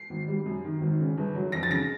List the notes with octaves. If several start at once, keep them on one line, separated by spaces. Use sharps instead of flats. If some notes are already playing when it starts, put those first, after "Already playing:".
Already playing: C7
G#1
G3
F#2
D#3
G#1
C#3
G1
F#3
F2 A#6
A6
C#3 A#6